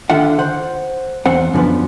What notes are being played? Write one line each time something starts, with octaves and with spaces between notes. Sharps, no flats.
D3 D#3 F4 E5 F#5
C5 F#5
E2 C4 F#5
F#2 D3 E3 F3 B3